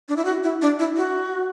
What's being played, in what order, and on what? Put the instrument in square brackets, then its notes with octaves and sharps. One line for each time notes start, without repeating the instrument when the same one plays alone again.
[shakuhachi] D4
E4
F#4
E4
D4
E4
F#4